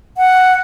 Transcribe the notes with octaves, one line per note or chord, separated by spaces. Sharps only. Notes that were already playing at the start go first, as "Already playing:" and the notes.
F#5